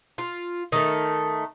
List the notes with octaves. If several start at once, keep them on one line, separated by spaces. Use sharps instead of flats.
F4
D#3 A3